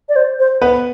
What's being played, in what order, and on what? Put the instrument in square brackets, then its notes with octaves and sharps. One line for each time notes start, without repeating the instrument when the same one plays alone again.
[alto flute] D5
C5
C5
[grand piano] B3 B4